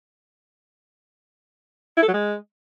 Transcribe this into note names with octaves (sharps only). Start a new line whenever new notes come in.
E4
A4
F#3
G#3